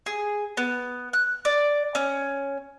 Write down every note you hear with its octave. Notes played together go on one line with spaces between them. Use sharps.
G#4
B3
F#6
D5
C#4